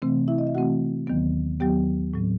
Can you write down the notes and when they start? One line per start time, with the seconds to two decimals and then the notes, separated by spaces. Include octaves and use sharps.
0.02 C3 E3 A3 C4
0.28 E4 E5
0.38 D#5
0.47 E5
0.55 C3 E3 A3 C4 F#4 F#5
1.07 D#2 D#3 F#3 B3
1.60 D#2 D#3 F#3 B3 G4 G5
2.14 A2 F#3 C4